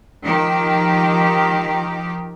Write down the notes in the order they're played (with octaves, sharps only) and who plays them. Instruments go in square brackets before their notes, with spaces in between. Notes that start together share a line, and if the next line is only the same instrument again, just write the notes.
[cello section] D#3 F3 G4